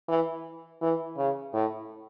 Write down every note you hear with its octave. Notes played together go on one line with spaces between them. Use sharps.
E3
E3
C#3
A2